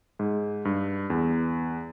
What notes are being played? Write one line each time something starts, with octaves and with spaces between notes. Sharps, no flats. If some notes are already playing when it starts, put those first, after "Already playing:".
G#2
G2
E2